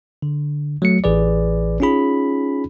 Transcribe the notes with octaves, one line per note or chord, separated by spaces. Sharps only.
D3
F#3 A3 C#7
A1 E3 G#4 B4 D5
C#4 D#4 F4 G#4 B5